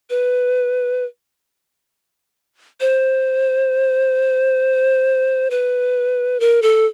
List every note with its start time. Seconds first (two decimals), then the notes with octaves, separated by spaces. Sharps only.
0.10 B4
2.80 C5
5.50 B4
6.40 A#4
6.62 A4